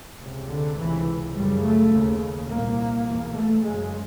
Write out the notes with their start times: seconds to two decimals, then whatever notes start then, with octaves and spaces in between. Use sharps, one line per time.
0.21 C#2 C3
0.50 D3
0.78 C#2 C3 E3
1.35 F#2 C#3 G3
1.64 A3
1.92 D#2 C#3
2.49 C2 A#2 A#3
3.06 E2 B2
3.35 A3
3.63 F#2 C#3 G#3